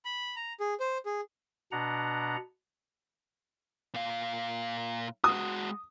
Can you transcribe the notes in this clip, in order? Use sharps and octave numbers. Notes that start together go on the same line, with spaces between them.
B5
A#5
G#4
C5
G#4
B2 D4 F#5 A#5
A#2 F5
G#3 F#4 D#6